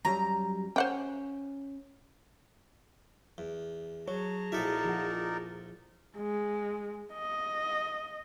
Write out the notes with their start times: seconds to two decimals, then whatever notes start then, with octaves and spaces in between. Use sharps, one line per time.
0.05 F#2 F#3 G3 A#5
0.76 C#4 C5 F#5 G5
3.38 E2
4.08 F#3 G#4 C#5 A5 A#5
4.52 A#1 D#4 E4 F#4 A4 A#4 D5 E5
4.85 F3 F4 F#5
6.17 G#3
7.14 D#5